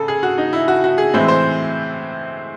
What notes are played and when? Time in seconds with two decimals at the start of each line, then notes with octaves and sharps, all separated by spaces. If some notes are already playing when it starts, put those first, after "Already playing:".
Already playing: C#3 A4
0.08 G#4
0.23 F#4
0.38 D#4
0.53 E4
0.68 F#4
0.84 F#4
0.98 G#4
1.13 A2 E3 G#3 C4 E4
1.28 C5